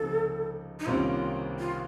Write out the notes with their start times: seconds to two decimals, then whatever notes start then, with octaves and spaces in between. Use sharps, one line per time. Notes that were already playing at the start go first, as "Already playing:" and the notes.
Already playing: C#2 C3 F3 A#3 D#4 A4
0.80 D#4
0.86 C2 C3 D#3 A#3 C#4 F4
1.59 F4